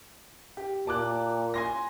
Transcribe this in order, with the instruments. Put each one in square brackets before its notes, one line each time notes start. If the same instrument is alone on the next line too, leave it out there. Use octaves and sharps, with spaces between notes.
[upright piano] G4
[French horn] A#2 [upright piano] A5 D6 F#6
[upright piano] G#5 C6 A#6